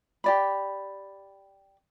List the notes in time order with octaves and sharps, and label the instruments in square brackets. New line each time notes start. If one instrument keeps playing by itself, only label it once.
[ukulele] G4 D5 B5